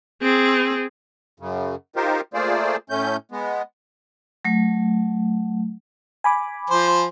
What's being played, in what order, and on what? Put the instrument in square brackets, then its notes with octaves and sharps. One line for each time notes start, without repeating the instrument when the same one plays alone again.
[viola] C4 G#4
[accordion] F#2 C#3
D#4 F4 G4 A#4 C5
A3 A#3 F4 G#4 C5 D5
A2 A3 C#4 G6
G#3 B3
[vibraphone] F#3 A3
[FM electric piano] G#5 B5 D6
[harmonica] F3 C5